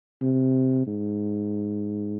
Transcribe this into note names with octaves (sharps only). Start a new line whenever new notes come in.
C3
G#2